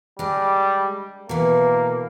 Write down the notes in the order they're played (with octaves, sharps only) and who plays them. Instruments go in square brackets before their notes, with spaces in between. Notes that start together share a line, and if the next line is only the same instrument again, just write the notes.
[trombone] G3 [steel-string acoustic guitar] G#3 D4
[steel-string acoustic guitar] B2 E3 [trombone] A#3